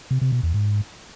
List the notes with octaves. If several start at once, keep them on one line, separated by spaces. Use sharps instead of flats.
C3
C3
B2
E2
G#2